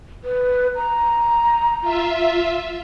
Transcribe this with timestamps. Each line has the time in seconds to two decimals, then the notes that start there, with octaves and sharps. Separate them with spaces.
0.24 B4
0.76 A#5
1.81 F4 E5